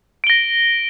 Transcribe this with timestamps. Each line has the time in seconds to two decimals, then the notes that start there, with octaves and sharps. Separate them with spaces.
0.24 D7
0.27 G7
0.30 A#6